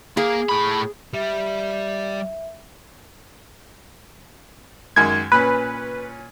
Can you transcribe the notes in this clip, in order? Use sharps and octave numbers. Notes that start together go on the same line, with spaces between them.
A#3 G#4
A2 B5
G3 E5
F#2 D#3 G#3 G#6
A#2 C#4 B4